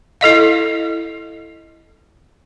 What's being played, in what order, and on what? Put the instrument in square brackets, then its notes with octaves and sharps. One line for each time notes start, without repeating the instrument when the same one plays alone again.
[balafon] E4 A4 D#5 F5